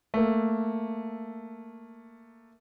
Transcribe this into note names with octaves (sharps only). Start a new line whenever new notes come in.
A3 A#3